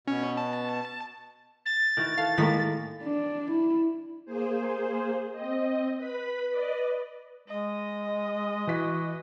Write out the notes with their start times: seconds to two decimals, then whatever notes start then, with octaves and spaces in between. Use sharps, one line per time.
0.08 B2 C#4
0.37 A5
1.66 A6
1.97 D#3 E3 F#4
2.18 A4 F5
2.38 A2 D#3 G#3 A#3 B6
3.03 D4
3.51 E4
4.26 A#3 G#4 C5
5.32 C4 D#5
5.97 B4 B5
6.49 B4 D5 D#5
7.48 G#3 D#5
8.67 E3 F#4 B6